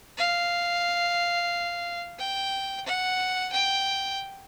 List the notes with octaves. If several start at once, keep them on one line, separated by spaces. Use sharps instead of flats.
F5
G5
F#5
G5